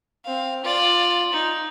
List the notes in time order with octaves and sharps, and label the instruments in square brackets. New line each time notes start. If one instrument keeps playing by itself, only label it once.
[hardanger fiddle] C4 F5
F4 D5
D#4